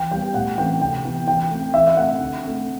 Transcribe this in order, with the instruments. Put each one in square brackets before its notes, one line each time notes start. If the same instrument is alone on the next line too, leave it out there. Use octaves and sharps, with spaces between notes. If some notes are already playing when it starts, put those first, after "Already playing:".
Already playing: [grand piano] E3 G5
G3 B3 G5
A2 F#5
E3 A3 C4 G5
C3 G5
E3 B3
E3 G5
A3 C4
E3 E5
E5
A3 C4 F#5
D3
A3 C4